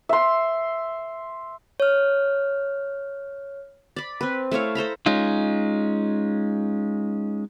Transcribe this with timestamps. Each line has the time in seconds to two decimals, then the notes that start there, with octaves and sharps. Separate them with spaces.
0.09 E5 C6
1.80 C#5 F6
3.96 D5 B5
4.21 C4 B4
4.51 A3 E4 C#5 F5
4.75 A4 C5 A#5 B5
5.06 G#3 C#4 D#4 F4